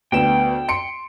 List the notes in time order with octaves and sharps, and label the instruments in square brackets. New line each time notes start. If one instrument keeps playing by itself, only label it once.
[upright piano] D2 B3 E7 [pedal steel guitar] G5
[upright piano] C6 C#7 D7